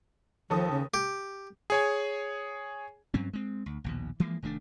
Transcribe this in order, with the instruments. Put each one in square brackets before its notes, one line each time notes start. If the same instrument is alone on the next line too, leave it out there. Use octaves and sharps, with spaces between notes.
[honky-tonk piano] D#2 A4 D#6 [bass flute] F3
[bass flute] C#3
[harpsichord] G4
[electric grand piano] G#4 C#5 G#5
[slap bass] G2 F#3 C4 C#4
G#3 C4
D2
A#1 D#2 B2
E3 F3 G#3 A#3
F1 D#3 A3 D4